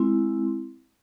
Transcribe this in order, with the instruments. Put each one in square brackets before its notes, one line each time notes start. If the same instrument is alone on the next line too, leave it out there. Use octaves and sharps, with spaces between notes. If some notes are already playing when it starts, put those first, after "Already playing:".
Already playing: [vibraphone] G#3 C4 E4